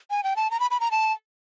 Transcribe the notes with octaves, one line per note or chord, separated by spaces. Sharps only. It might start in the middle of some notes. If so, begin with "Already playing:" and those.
G#5
G5
A5
A#5
B5
B5
A#5
A5